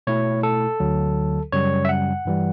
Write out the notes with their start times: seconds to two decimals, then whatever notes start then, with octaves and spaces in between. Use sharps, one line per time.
0.07 B2 A3 E4 C#5
0.43 A4
0.80 D2 D3 F#3
1.52 F#2 C#3 G3 C#5
1.85 E5
1.89 F#5
2.25 G2 E3 G3